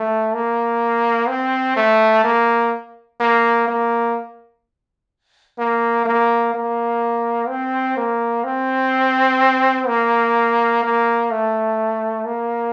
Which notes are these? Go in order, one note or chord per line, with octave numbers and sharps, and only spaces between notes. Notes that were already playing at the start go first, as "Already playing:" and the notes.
Already playing: A3
A#3
C4
A3
A#3
A#3
A#3
A#3
A#3
A#3
C4
A#3
C4
A#3
A#3
A3
A#3